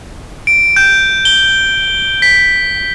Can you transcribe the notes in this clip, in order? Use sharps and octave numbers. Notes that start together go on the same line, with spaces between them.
D7
G6
G7
B6